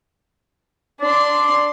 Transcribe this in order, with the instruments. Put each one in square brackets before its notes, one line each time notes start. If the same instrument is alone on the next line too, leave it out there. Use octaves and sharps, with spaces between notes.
[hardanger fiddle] D4 C6 [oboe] D5